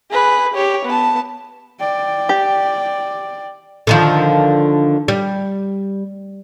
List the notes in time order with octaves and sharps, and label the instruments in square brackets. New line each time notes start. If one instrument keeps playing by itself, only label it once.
[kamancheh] G#4 B4
G4 C#5
B3 A5
[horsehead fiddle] D5 G5
[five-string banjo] G4
[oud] D3 D#3 F3
G3